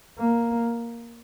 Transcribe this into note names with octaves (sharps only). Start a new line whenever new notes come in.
A#3